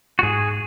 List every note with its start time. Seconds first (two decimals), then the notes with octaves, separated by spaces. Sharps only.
0.19 F#4
0.23 G#2 G#4